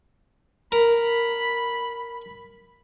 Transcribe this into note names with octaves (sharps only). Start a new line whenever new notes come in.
A#4 B5